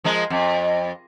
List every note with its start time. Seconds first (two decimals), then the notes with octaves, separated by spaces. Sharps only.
0.04 F3 G#3 A#4
0.30 F2